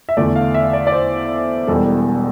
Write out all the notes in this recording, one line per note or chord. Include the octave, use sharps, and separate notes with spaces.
E5
E2 D3 A3 D5
F5
E5
D5
D5
C5
E1 E2 B2 G3 A4